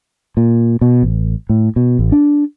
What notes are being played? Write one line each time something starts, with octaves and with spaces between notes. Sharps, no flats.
A#2
B2
A1
A2
B2
A1
D4